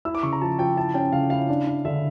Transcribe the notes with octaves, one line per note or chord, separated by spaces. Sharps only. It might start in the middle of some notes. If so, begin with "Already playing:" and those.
E4 E6
D6
C#3 C#6
A#5
F3 A5
F3 G5
E4 A5
C#4 G5
C#3 F5
E4 F5
D4
D4
D3 E5